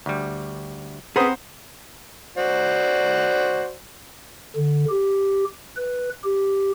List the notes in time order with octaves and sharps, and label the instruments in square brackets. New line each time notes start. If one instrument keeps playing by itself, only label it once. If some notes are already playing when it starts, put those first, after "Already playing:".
[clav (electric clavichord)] D2 G3
[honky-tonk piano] C4 D#6 [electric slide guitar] G#4 B4 [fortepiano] C5 F#5 A#5
[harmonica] F#4 C5 D5
[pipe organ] D3
G4
B4
G4